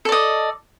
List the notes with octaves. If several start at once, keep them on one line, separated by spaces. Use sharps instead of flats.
A4 D5 D#5